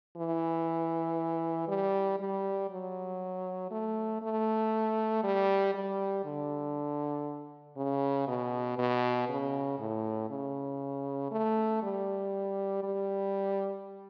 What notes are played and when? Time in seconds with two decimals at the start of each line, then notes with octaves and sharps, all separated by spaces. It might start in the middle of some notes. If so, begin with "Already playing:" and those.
0.17 E3
1.68 G3
2.19 G3
2.70 F#3
3.71 A3
4.22 A3
5.23 G3
5.74 G3
6.25 D3
7.77 C#3
8.27 B2
8.78 B2
9.29 C#3
9.79 A2
10.30 C#3
11.31 A3
11.82 G3
12.83 G3